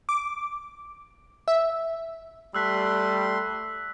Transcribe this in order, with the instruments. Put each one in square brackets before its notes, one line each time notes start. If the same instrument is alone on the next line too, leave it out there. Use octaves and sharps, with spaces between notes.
[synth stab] D6
E5
[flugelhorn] G3 [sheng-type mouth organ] A3 C6 [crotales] E6 F#6 B6